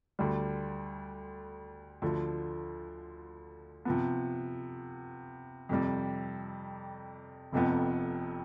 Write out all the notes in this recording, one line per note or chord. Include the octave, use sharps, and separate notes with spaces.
D2 D3 G3
D2 D3 F3
C3 F3 B3
F2 C3 G3
F1 F2 C3 F3 B3